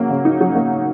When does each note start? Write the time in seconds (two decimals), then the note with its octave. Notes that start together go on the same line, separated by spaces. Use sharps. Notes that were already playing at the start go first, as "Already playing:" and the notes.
Already playing: C#3 F#3 A#3
0.10 C#3
0.25 D#4
0.41 F#3
0.55 A#3